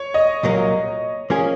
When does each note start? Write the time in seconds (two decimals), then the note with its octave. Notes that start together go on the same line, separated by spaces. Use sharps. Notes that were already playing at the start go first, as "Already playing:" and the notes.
Already playing: C#5
0.14 D#5
0.43 C2 A#2 F#3 A#3
1.30 F3 A#3 C#4 G#4